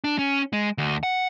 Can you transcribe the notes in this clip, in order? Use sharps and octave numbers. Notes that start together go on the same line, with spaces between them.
D4
C#4
G#3
D2
F#5